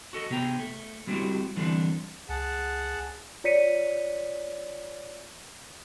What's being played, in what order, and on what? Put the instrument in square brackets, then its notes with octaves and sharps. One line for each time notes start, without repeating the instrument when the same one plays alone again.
[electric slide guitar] F#4 A4 D#5
C3 B3 G#4 G5 A#5
A3
G3 G#3 C4 E4 F#4 G4
D3 E3 G3 A3 C4 D4
[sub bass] C#2 [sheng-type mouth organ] G#4 F#5 A5
[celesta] F4 C#5 D5 B6 C#7 D#7